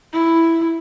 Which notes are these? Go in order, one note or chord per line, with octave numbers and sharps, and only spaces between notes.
E4